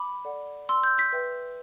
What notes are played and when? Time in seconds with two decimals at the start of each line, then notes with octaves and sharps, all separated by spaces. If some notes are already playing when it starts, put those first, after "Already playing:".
Already playing: B5 D6
0.25 A4 D5 F#5
0.69 C6 E6
0.83 E6 G6
0.98 G6 B6
1.12 B4 E5 G5